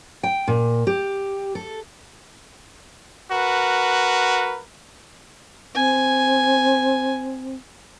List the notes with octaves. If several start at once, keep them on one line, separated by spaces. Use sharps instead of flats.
G5
A#2
G4
A4
F#4 A#4 B4
C4 G#5